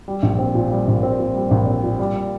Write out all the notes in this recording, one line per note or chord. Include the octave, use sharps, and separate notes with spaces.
G3
A#1
C4
A#2
G3
A#1
C4
A#2
G3
A#1
C4
A#2
G3